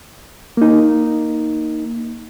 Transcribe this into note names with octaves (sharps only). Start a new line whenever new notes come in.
A#3 D#4